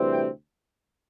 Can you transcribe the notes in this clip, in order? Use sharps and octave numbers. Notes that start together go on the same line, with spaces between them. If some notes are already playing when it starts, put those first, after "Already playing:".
Already playing: D2 C3 E3 G3 C4
G5